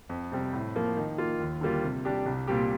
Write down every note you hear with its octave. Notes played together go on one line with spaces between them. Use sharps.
F2
C3 G3 C4
A2
F3 A#3
D#3
A#3 F4
D#2
D3 G3 A#3 F4
C3
G3 D4 G4
C2
A#2 G3 C4 G4